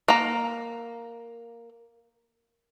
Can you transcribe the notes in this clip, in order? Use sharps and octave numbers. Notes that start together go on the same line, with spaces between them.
A#3 A#5